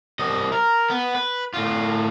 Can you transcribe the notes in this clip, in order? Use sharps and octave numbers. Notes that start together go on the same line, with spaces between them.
C2 D#5
A#4
B3
B4
A2 F4